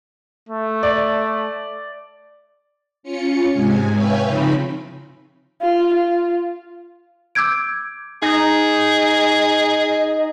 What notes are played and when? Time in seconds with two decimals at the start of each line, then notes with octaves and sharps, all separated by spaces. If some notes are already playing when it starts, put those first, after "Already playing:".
0.49 A3
0.83 D5
3.03 C#4 F4 C#7
3.51 G#2 C3 G#3 G#5
3.93 B4 C#5 E5 F5 G5 G#5
4.26 C#3 F3 C4 D#4 B5
5.62 F4
5.94 F4
7.35 D6 E6 G6 G#6 D7
8.22 D#4 G#4